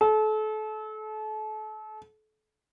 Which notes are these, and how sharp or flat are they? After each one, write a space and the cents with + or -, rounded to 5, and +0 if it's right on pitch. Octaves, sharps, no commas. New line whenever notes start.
A4 -35